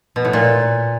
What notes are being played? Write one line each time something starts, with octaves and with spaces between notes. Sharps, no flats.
B2
A2
A#2